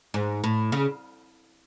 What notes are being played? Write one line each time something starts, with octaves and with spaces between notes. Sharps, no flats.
G#2
A2
C#3